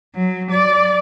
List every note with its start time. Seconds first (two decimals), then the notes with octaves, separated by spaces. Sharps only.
0.15 F#3
0.51 D5